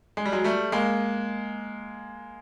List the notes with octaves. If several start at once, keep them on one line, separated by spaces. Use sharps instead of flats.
G#3
G3
F#3 G#3
G3 A3
G#3 A#3